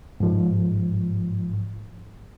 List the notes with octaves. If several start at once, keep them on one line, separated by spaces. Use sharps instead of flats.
G#2 F3